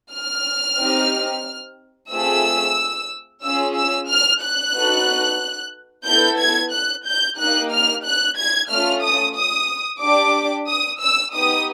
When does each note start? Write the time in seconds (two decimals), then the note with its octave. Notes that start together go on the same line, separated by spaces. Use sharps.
0.13 F6
0.79 C4 D#4 G4
2.11 A3 C4 F4 G#4 E6
3.43 C#4 F4 G#4 E6
3.76 E6
4.08 F6
4.42 F#6
4.74 B3 D#4 F#4 A4
6.06 B3 E4 A4 G6
6.40 G#6
6.72 F#6
7.05 G6
7.38 A#3 D#4 G4 F#6
7.72 F6
8.05 F#6
8.37 G#6
8.70 A3 C#4 F4 F6
9.03 D#6
9.35 D#6
10.01 D4 G4 D6
10.68 D#6
11.00 E6
11.33 B3 D#4 G4 D#6